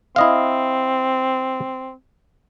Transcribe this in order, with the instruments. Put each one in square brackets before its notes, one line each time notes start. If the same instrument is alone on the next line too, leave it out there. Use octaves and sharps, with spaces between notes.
[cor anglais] C4 [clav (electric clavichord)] E4 D#5 F5